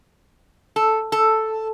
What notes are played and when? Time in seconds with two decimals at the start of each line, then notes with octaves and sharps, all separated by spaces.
0.76 A4
1.12 A4